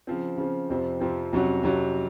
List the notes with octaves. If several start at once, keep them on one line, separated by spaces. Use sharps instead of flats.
C#3 F3 C4
C#3 F3 C4
F2 C3 F3 C4
F2 C3 F3 C4
F2 C3 F#3 C#4 F#4
F2 C3 F#3 C#4 F#4